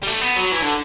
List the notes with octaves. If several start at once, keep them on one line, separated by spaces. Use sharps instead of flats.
G3
A3
B3
F#3
E3
D3